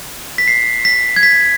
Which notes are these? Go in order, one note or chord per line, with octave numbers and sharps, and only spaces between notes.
B6
C7
B6
G#6
B6